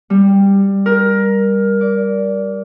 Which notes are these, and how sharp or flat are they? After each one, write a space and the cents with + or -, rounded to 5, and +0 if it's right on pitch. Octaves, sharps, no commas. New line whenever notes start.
G3 +10
A#4 +15
D5 -20